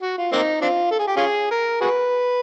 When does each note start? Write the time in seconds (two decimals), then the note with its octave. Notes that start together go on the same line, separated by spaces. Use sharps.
0.02 F#4
0.18 F4
0.33 A#3 C4 D#4
0.61 C4 D4 F4
0.91 A4
0.99 G#4
1.08 G4
1.16 C#4 F4 G#4
1.51 A#4
1.81 F#4 G#4 B4